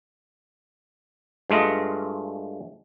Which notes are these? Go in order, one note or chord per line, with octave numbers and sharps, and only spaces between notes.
G2 G#3 A3 F4 D#5